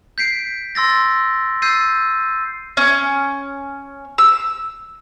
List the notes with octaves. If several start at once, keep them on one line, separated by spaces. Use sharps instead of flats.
G6 B6 C7 D7
C6 E6 A6 A#6
E6 G6 A6 C7 D#7
C#4
E6